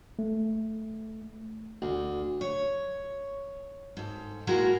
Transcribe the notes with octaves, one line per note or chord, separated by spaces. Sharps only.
A3
D2
C#5
G#2 A4
A#2 G#3 E4 F#4 A#4 G5